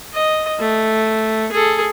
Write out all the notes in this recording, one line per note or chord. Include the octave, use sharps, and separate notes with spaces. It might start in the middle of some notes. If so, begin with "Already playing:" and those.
D#5
A3
G#4 A4